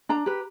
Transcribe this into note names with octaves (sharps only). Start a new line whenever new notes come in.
D4 A#5
G4 B4